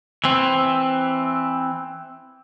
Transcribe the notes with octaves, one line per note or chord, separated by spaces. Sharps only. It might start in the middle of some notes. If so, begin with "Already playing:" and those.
E3 C4